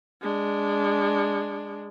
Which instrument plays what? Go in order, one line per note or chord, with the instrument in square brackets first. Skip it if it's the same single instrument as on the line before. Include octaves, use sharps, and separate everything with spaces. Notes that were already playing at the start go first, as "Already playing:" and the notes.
[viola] G#3 D4